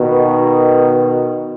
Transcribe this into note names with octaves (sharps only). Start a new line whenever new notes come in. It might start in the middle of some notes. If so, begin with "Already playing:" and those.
Already playing: B2 D#3